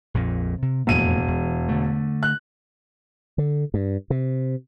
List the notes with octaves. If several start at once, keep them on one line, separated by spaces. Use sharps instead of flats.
A#1 F2 A#2
C3
E1 F2 A2 A#3 D#7
E2
D3 A3
F#6
D3
G2
C3